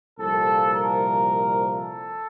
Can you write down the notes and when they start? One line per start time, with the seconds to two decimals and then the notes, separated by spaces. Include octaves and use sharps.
0.17 C2 A#2 F3 A4
0.68 A#4
1.69 A4